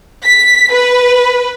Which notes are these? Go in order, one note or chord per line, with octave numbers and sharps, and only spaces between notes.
B6
B4